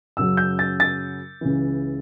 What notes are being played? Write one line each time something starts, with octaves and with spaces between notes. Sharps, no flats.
F#2 C#3 F#3 E6
G6
A6
A6
C#2 C#3 E3